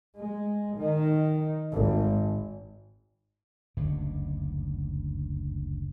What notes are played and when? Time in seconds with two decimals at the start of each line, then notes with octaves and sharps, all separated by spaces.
0.17 G#3
0.77 D#3
1.73 G#1
3.77 F#1 D2 G2 D3